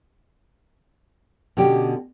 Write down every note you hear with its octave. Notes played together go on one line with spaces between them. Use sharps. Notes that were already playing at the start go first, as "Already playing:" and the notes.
B2 D3 C#4 G4